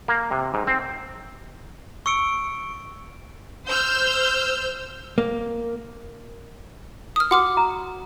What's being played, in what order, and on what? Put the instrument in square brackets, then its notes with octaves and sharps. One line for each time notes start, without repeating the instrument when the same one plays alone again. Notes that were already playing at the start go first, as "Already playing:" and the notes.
[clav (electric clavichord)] A#3
C3
G#2
C4
[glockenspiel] C#6 E6 C#7 D7
[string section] C5 E6 F6 G6
[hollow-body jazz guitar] A#3
[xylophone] D#6 F6
[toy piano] F#4 [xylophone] F#5 D6 F6
[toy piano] A#5